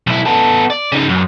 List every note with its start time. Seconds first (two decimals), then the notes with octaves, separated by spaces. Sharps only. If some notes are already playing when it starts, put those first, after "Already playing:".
0.07 B1 E4
0.26 B3 A4
0.70 D5
0.92 C#3 D#4
1.09 F#2